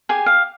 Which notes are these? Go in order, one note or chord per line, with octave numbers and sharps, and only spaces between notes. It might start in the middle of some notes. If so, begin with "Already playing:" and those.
G4 G#4 G#5
F5